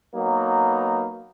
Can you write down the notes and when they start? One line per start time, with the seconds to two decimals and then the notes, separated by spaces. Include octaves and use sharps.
0.15 F#3 A#3 B3 D#4